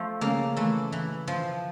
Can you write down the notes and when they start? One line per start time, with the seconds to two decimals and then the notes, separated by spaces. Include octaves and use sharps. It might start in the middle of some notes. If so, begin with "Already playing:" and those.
Already playing: F3 A3
0.21 C#3 A#3
0.57 E3 A3
0.92 E3
1.28 F3